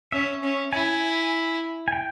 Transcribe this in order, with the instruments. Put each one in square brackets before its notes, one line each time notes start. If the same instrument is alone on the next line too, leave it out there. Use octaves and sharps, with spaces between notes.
[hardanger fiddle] C#4 [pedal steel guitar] E5
[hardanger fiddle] C#4
[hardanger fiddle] E4 [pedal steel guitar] G#5
[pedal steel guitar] G#5
G5